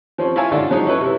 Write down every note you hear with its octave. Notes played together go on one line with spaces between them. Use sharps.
F3 C4 C#4
E4 F4 C#5 F5 G#5 A5
G#2 D3 F4 A4 D5
F3 F#3 G#3 D#4
C#4 E4 A4 B4 C#5
C3 E4